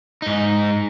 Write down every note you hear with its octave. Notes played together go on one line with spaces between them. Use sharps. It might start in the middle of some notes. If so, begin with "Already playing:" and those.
G#2 D#4